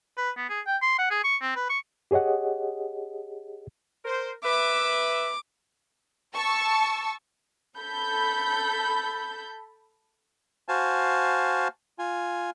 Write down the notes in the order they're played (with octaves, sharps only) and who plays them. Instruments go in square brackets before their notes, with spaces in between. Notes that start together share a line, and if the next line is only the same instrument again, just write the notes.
[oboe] B4
B3
G#4
G5
C6
F#5
G#4
C#6
C4
B4
C#6
[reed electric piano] G4 G#4 C#5 D#5 F#5
[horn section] A#4 C5
[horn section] B4 E5 [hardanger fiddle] D6
[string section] A5 C#6 E6
A4 B5 G6
[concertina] F#4 C5 F5 G#5 A5
F4 G#5